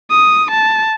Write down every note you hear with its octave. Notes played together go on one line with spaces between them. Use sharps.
D#6
A5